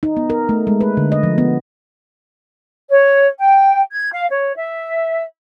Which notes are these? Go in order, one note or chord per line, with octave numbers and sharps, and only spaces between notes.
D#4
B3
A#4
A3
G#3
B4
D3
D#5
F3
B3
C#5
G5
G#6
F5
C#5
E5